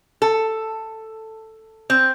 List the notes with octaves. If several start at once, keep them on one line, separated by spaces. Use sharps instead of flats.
A4
C4